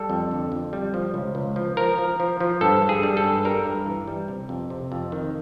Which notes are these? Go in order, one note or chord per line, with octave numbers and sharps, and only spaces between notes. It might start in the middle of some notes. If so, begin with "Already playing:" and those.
Already playing: G3 A4
F2
D3
F2
G3
F3
C#2
C#2
F3
F3 A#4
F3
F3
F3
G2 A4
G2
G#4
G3
A4
G2
G3 A#4
G2
E3
G3
C3
F2
C3
F2
D#3